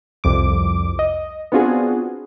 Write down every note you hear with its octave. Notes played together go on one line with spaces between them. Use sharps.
C2 F2 D6
D#5
B3 C4 D4 F4 F#4 G#4